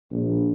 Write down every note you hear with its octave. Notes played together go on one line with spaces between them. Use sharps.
A#1